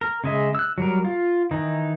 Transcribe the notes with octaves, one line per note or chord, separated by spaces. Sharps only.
A#4
C#3 G#3 D#5 E5
E6 F#6
F#3 G3 A#4
F4
D#3 E3 D#4